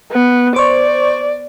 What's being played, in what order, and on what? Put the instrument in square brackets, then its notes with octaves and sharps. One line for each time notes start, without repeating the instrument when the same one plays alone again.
[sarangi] B3
[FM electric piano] C5 C#6 [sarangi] D5